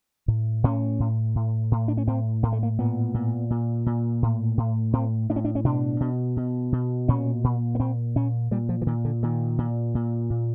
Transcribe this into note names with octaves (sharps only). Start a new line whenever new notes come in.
A2
A2 C#4
A2
A2
A2
D4
C#4
A2 C4
A2 A#3
A3
A#3
A#2 B3
A#2
A#2
A#2
A2
A2
A2 C4
A2 D4
C#4
D4
C#4
B2 D4
B2
B2
B2
A#2 C#4
A#2
B3
A#2 C4
A#2 C#4
A#2 G3
F3
E3
A#2 D#3
D3
A#2 D#3
A#2
A#2
A#2